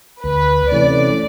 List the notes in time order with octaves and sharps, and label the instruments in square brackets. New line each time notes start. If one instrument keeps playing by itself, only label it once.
[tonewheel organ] D2 [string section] B4
[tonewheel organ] C3 E3 A3 C#4 [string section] D5